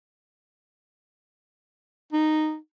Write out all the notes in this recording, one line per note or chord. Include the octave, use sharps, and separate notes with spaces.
D#4